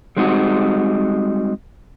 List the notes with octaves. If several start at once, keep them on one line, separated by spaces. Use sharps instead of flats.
G3 G#3 C4 D#4 F#4